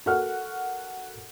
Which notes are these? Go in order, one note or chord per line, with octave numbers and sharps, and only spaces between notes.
F#4 A4 A#4 F#5 F6